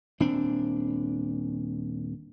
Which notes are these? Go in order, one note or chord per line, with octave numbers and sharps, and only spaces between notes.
D#1 C4 D4